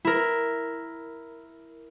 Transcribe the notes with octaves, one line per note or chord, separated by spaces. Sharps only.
E4 A#4